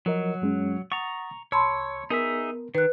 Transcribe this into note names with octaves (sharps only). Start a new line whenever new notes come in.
F3 F#3 A#4 D#5
F#2 G#3 C#4
F#5 A#5 C#6 D#6 A6
C2 C#5 A5 B5 C6 E6
B3 D#4 G#4 A#4 E5
D#3 B4 F#6